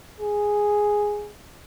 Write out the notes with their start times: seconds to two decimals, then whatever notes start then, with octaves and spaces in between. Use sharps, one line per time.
0.21 G#4